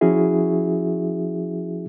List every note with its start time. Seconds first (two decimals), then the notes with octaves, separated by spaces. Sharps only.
0.01 F3 C#4 E4 F#4 G#4 E5